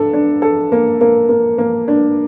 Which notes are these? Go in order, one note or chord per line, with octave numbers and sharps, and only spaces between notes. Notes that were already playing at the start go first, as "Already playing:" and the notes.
Already playing: D4 A4
D4
A4
A#3
A#3
A#3
A#3
D4